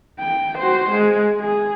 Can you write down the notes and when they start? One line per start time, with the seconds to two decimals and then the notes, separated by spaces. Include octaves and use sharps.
0.20 G5
0.59 F#4 C5
0.90 G#3
1.41 G#4